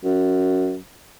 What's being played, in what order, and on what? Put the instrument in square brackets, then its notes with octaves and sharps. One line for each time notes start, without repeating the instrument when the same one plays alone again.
[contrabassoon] F#2